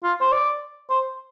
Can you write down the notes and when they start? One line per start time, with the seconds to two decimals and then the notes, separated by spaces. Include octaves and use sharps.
0.04 F4
0.21 C5
0.32 D5
0.90 C5